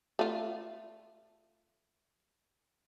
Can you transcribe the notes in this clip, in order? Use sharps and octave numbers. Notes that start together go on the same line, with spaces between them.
A3 F4